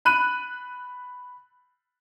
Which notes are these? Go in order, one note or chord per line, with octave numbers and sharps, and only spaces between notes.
B5 F#6 D#7